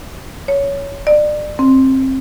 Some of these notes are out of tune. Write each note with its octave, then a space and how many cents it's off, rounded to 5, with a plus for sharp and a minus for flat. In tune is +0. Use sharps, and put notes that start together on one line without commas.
C#5 +15
D5 +30
C4 +20